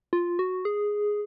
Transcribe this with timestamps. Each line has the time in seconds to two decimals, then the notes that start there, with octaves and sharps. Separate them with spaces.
0.13 F4
0.39 F#4
0.65 G#4